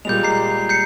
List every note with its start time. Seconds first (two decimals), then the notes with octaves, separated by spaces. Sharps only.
0.05 A#2 G3 G#3 G6 F7
0.23 A#5 G6 C7
0.69 G6 C7 C#7